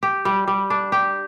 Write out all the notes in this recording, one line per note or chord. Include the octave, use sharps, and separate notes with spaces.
G4
G3
G3
D4
G4